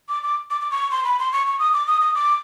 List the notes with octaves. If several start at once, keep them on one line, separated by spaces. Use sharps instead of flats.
D6
D6
D6
D6
C#6
C6
B5
C6
C#6
C#6
D#6
D6
D#6
D#6
D6